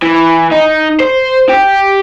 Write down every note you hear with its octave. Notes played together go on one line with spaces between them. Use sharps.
E3
D#4
C5
G4